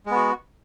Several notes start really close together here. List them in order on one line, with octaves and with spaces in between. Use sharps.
G#3 B3 F#4